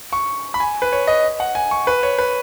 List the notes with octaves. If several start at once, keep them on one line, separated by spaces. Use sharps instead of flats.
C#6
B5
G#5
B4
C#5
D#5
F#5
G#5
C#6
B4
C#5
B4